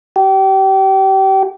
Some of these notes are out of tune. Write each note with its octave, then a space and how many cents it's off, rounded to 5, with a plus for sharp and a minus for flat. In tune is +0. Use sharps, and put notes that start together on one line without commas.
G4 -30